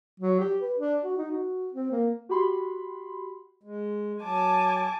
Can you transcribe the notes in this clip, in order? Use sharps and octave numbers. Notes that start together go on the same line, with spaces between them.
F#3
G4
B4
D4
F#4
D#4
F#4
C4
A#3
F#4 G4 B5 C6
G#3
F#3 G#5 A5 D6